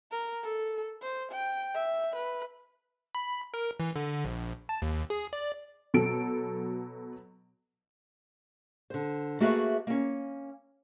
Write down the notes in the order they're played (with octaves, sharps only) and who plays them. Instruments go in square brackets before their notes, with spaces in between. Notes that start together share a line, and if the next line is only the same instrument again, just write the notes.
[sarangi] A#4
A4
C5
G5
E5
B4
[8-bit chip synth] B5
A#4
E3
D3
A#1
A5
D#2
G#4
D5
[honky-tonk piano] B2 F#3 A4 D7
[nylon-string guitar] D3 C5
A3 A#3 F#4 G#4 B4 E5
A#3 C#4